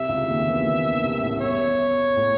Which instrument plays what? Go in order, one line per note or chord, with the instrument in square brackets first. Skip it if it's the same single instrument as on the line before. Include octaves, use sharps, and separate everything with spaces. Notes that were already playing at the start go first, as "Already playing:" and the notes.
Already playing: [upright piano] C2 C3 [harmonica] E5
[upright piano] C#2 C#3
D#2 D#3
E2 E3
D#2 D#3
C2 C3
A1 A2
[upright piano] E2 [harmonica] C#5
[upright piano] A2